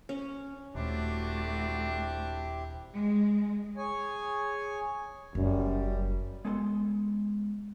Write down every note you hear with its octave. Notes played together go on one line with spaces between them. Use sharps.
C#4
D#1 A3 C4 D4 E4 F#4 G4
G#3
G#4 C#5 G#5
F#1 F#2 G3
G#3 B3 A4 G#5 C6